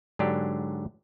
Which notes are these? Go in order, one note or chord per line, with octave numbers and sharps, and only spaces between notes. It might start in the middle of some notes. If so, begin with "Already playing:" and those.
G#2 D3 F#3 D4 G4